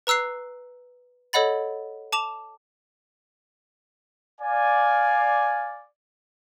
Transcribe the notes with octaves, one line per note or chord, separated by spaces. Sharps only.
B4 A#5 E6 F#6 C7
A4 C#5 D#5 F#5 B5 A6
A5 D6 E7 F7
D5 F5 G#5